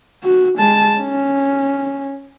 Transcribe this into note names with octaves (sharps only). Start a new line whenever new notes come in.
F#4
G#3 A5
C#4